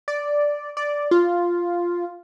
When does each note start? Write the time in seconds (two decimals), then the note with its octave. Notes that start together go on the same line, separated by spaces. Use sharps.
0.08 D5
0.77 D5
1.11 F4